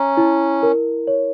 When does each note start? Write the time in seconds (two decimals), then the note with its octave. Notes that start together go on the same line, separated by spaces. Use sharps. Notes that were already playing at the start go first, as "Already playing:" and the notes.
Already playing: C#4 A#5
0.17 E4
0.63 A#4
1.07 C#5